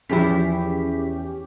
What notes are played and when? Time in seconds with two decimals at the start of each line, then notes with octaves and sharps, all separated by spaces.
0.09 E2 F3 C#4 E4 G4 G#4 B6